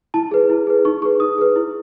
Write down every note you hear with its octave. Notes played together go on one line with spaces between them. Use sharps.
E4 A5
G#4 B4
E4
G#4 B4
D#4 C#6
G#4 B4 C#6
D#4 D#6
G#4 B4
E4